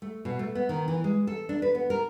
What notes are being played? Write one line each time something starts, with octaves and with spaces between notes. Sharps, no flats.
A3
B2
A3
B3
D#3
E3
G#3
A4
D4
B4
B3
A#4